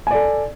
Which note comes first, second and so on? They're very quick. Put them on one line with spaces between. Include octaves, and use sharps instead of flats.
G#5 D5 A4